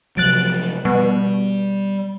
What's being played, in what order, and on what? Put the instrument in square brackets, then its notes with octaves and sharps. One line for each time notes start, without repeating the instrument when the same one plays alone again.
[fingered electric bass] C3 F3 F#3 [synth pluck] F#6 A6 D7
[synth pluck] B2 [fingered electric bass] G3